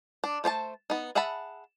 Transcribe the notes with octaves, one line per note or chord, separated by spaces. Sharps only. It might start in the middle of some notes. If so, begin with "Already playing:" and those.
D4
A3 C5 C#5 A5
B3 D#4
G#4 E5 F#5 A5 B5